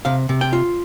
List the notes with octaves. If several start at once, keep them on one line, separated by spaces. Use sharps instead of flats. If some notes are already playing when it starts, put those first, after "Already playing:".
C3 F5
C3
G5
F4